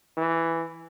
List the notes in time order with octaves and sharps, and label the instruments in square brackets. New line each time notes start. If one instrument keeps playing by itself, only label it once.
[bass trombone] E3